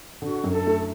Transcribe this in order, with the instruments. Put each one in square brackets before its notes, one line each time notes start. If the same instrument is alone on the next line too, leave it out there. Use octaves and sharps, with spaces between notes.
[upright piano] D3 [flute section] F#4
[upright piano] F#2
[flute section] A4
[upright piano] A3